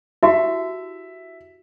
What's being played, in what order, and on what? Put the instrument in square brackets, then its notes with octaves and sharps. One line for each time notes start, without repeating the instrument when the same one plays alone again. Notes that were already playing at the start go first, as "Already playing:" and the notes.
[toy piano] E4 F#4 G4 [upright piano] E5